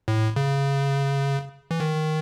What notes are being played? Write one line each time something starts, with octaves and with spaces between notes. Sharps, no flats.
A2
C#3
E3
D#3